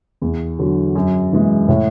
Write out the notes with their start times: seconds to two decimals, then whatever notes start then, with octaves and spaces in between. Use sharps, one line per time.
0.22 E2
0.59 D3 F#3
0.95 F#2
1.32 E3 G#3
1.68 A2